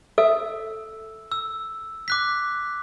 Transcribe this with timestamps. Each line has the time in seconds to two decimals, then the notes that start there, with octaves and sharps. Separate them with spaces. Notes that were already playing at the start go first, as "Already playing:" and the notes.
0.18 A4 E5 E6
1.32 E6
2.08 D6 F#6 B6